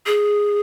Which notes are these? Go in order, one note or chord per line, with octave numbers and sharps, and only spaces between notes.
G#4